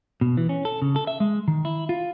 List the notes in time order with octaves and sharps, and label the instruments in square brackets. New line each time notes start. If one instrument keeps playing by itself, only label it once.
[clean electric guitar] B2
E3
C#4
A4
C#3
A4
E5
G#3
D#3
E4
F4